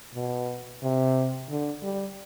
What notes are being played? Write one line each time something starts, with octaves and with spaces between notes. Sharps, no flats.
B2
C3
D3
G3